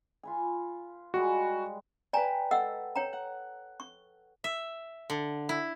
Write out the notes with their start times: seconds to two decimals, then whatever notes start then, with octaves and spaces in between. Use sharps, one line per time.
0.23 F4 B4 G#5
1.14 G3 G#3 F#4 B4
2.13 B4 D5 G5 G#5 A#5
2.51 A4 D#5 F#5 E6
2.96 C#5 G5 A#5
3.13 F#5
3.80 C#6
4.44 E5
5.10 D3
5.49 E4